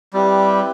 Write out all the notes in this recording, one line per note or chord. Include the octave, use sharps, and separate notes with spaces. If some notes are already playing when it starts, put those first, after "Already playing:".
G3 C4 E4 G4 B4